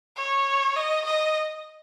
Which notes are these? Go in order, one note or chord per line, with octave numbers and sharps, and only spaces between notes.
C#5
D#5
D#5